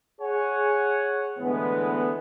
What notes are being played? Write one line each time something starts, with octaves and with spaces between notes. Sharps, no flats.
G#4 C#5 F#5 G#5
A2 D3 E3 G#3 B3